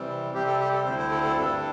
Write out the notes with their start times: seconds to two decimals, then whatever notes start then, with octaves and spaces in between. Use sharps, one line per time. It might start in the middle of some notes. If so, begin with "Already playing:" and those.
Already playing: C3 E3 G3 C4
0.34 C3 G3 C4 G4
0.47 A4
0.60 G4
0.72 A4
0.85 D2 D3 C4 E4 C5
0.98 C5
1.11 A4
1.23 A4
1.36 G2 G3 D4 A4